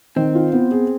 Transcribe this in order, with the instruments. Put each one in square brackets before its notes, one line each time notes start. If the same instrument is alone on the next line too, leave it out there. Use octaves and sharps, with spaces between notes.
[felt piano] D#3 [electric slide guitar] C4
[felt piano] F4
B3
G#4